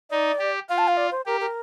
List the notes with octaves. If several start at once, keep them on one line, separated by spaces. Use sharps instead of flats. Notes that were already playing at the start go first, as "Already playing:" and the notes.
D#4 D5
G4
F4 F5
A5
F5
D5
C5
G4 A#4
A#4